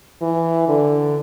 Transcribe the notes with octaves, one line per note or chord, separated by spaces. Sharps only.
E3
D3